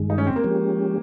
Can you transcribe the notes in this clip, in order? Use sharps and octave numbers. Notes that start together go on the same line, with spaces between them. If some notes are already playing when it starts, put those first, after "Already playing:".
Already playing: G2 D#3 G#3
D#4
C#4
C4
A#3
F3 G#3 C#4 G4